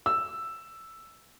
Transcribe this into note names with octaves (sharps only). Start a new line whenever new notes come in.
E6